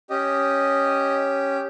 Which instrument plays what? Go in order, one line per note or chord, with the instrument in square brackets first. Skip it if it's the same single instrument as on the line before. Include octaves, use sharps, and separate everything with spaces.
[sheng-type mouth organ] C#4 G4 D#5